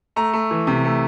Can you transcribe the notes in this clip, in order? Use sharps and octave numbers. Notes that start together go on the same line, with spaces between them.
A3 A#5
A3
E3
C3
A3